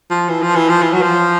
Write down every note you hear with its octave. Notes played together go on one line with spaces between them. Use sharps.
F3
E3
F3
E3
F3
E3
F#3
F3